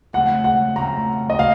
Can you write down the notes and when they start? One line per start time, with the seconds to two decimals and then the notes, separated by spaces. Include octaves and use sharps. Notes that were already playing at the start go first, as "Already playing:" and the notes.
0.13 F2 C#3 A3 D#4 F#5
0.44 F#5
0.76 F2 C#3 A3 C4 F4 A#5
1.30 D#5
1.39 C#3 A3 F#4 F5